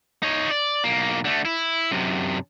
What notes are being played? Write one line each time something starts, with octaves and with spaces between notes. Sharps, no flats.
D#4 C#5
D5
B1 A#3
D3 A3
E4
F#2 C3